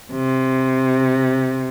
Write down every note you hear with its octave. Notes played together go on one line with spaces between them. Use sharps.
C3